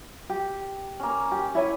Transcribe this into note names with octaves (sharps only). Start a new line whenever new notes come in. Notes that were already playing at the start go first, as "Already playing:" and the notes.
G4
A#3 C#4
G4
E4 C#5 G#5